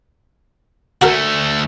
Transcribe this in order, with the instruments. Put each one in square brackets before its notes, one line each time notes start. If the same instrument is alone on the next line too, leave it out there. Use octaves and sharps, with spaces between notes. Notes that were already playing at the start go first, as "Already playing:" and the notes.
[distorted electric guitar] D2 A3 [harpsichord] F#4 A#4